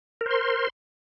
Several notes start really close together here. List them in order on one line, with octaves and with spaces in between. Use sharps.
A#4 C5 C6